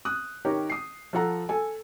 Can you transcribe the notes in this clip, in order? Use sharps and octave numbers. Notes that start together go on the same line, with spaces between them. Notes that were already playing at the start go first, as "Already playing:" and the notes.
D#6 F#6
D#3 G4 A#4 C#5
D#6 C7
F3 F4 A4 F#5 A#5
A4 G#5